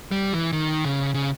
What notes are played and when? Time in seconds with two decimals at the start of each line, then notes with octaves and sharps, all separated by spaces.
0.11 G3
0.33 E3
0.53 D#3
0.85 C#3
1.14 C#3